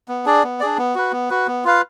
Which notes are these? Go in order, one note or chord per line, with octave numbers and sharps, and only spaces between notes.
B3
D4 G#4 D5
B3
D4 G#4 D5
B3
F#4 B4
B3
F#4 B4
B3
F4 B4 F5